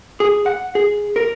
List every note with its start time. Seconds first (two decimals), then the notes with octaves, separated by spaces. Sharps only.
0.20 G#4
0.46 F#5
0.75 G#4
1.16 A#4